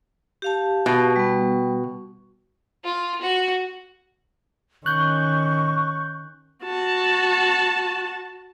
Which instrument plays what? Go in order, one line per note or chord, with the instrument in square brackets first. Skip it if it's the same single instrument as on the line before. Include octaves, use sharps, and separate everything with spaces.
[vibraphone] G4 F5 A5
[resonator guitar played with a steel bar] B2
[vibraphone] G3 B3
[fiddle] F4
F#4
[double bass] D#3 C#4 [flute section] C#6 [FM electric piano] F#6 G6
[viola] F#4 A5